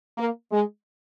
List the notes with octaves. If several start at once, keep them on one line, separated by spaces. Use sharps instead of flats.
A#3
G#3